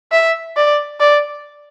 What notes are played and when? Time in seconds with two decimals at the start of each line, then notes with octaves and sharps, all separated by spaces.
0.12 E5
0.57 D5
1.00 D5